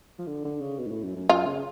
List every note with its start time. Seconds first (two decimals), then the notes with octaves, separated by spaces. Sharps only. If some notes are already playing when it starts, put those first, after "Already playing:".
0.19 F3
0.27 D3
0.45 D3
0.61 C#3
0.79 B2
0.87 G#2
0.92 A2
1.04 F#2
1.16 F#2
1.29 F#2 F4
1.46 C#3